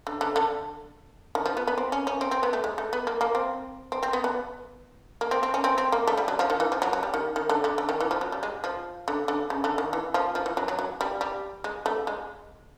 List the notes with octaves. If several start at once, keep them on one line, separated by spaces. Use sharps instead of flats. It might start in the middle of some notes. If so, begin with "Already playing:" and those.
D3
D3
D3
D#3
F3
B3
B3
C4
C#4
C#4
C4
C4
B3
A3
G#3
A3
B3
A#3
A#3
C4
C4
C4
B3
B3
A#3
C4
C4
C#4
C4
C4
A#3
A3
G3
F#3
F3
D#3
E3
F3
F#3
F#3
G3
D#3
D#3
D3
D3
D3
D#3
E3
F3
F#3
G3
G#3
F3
D3
D3
C#3
D3
D#3
E3
F3
F3
E3
F#3
F#3
F#3
G3
G3
G#3
A3
G#3